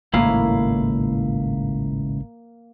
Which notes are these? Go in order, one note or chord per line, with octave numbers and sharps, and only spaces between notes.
G#1 C#2 A2 A#3 E4 F5